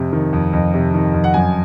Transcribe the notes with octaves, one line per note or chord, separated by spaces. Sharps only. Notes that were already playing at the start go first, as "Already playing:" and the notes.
Already playing: F2 C3
D#3
F2
F2
C3
D#3
F2
F#5
F#2 G#5